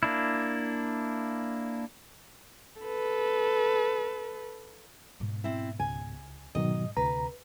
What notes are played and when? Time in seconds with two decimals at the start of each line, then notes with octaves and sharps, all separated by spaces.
0.03 A#3 D4 E4
2.82 A4 B4
5.20 G#2 B2
5.44 C4 E4
5.80 C#2 G#5
6.55 G#2 B2 D#3 F#3 D#5
6.97 D2 C3 B4 A#5